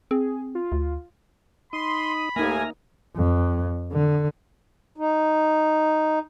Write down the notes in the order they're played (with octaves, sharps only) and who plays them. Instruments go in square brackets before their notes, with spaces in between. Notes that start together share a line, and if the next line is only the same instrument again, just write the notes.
[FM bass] C4 [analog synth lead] G#4
[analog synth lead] F4
[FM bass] D2
[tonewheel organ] D#4 D#6 [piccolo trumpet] B5 [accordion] C6
[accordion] D#2 A2 G#5 [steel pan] A#3 D#4 [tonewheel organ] E5 F6 A#6
[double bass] F2
D3
[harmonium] D#4